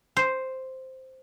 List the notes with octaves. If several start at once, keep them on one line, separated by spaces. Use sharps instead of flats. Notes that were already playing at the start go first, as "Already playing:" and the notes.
C5